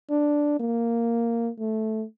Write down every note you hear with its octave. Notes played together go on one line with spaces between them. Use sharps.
D4
A#3
A3